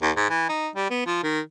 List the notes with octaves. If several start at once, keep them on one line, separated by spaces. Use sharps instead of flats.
D#2
G#2
E3
D#4
G3
B3
F3
D#3